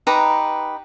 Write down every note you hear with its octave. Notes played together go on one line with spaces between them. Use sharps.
D#4 G4 B4 A#5